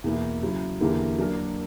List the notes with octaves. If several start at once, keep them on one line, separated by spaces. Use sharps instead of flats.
E2 B2 A#3 E4
C#3 F#3 C#4 E4
E2 D3 A#3 E4 G4
F#3 A#3 D4 F#4 A#4